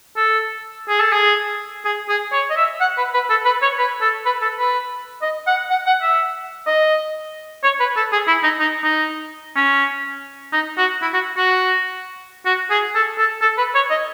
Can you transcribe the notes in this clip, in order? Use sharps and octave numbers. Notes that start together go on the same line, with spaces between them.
A4
G#4
A4
G#4
G#4
G#4
C#5
D#5
E5
F#5
B4
B4
A4
B4
C#5
B4
A4
B4
A4
B4
D#5
F#5
F#5
F#5
E5
D#5
C#5
B4
A4
G#4
E4
D#4
D#4
D#4
C#4
D#4
F#4
E4
F#4
F#4
F#4
G#4
A4
A4
A4
B4
C#5
D#5